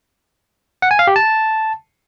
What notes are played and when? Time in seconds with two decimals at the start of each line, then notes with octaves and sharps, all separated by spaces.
0.82 F#5
0.91 G#5
0.99 F5
1.07 G4
1.16 A5